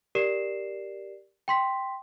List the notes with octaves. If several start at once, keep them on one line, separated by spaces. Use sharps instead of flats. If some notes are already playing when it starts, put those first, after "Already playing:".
G4 A#4 D5 C7 E7
G5 C6 B6